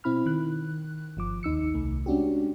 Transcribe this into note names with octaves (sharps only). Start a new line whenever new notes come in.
B2 C4 E4 B5 F6
D#3 F#6
G1 F3 D6
D#2 D#4 E6 C#7
C2 A3
G#3 C#4 D4 F#4 G4